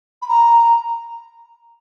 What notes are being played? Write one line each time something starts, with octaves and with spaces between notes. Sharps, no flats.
B5
A#5